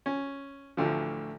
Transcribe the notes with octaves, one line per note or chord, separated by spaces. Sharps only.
C#4
A1 D2 D3 F3